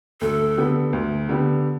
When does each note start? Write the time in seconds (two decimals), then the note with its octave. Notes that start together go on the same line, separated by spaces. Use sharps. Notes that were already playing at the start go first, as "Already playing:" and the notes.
0.21 D2 A4
0.57 D3 B3 G4
0.93 D2
1.29 D3 B3 G4